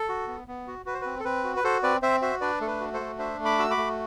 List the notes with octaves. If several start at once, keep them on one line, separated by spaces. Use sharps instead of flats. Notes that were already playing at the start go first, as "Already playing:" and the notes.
Already playing: A4
F#4
B3
B3
F#4
F#4 B4
C5
C4 B4
A4
C4 B4
F#4
B4
F#4 A4 C5
C4 B4 D5
C4 C5 E5
F#4 C5 E5
D4 B4 D5
A3 A4
B4
F#4
A4 C5
A3
D4 C5 E5
A3
B5 D6
F#4 E6
B5 D6
A3